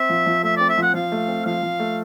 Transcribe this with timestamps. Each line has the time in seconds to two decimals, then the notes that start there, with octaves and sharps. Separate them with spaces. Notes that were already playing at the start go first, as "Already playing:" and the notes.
Already playing: C4 E5
0.10 F3
0.26 F3
0.43 A3 E5
0.57 C4 D5
0.70 E5
0.78 F3 F#5
0.94 F3 F5
1.12 A3
1.28 C4
1.46 F3 F5
1.63 F3
1.80 A3